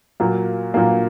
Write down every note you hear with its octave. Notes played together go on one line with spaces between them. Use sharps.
A#2 F#3 A#3
A#2 F#3 A#3